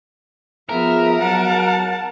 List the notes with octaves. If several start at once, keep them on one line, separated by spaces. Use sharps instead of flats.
F3 B3 G#4 A#4 E5
F#3 F#5 A5